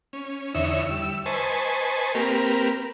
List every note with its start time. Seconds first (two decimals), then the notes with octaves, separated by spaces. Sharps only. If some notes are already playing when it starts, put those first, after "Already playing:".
0.13 C#4
0.54 E2 D3 D#4 C#5 E5
0.90 G3 E6
1.26 B4 C5 D#5 G#5 A5 C#6
2.15 A#3 C4 G4 A#4 B4